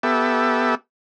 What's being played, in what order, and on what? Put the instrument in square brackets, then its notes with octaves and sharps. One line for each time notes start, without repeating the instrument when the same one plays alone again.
[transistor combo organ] B3 G4 A4 E5